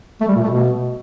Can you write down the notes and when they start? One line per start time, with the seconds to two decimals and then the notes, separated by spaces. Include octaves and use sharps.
0.21 A3
0.28 G3
0.35 A#2
0.43 A3
0.50 B2